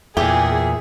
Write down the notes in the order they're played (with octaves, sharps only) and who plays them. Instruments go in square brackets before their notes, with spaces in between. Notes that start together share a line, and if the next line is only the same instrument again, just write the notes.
[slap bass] E2 A#2 [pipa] G4 [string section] G#4 [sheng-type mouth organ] E5